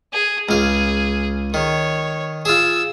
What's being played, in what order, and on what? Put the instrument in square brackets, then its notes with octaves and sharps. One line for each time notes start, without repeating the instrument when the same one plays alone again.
[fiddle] G#4
[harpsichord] C#2 F5 [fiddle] G#4
[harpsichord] D#3 [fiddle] C#5
[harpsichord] F4 G#4 [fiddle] E6